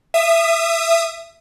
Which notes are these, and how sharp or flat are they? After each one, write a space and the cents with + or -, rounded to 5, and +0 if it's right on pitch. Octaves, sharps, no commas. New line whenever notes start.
E5 +15 D#6 -10